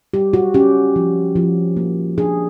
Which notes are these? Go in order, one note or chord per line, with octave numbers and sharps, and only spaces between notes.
G3 G4
F#4
C#4 G4
F3
F3
A#3
D4 G#4